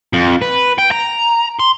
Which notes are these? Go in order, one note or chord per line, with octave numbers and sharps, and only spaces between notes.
F2
B4
G5
A#5
C6